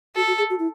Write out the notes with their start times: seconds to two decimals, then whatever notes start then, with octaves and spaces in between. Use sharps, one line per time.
0.16 F#4 A4
0.27 F#4
0.38 G#4
0.50 F#4
0.59 E4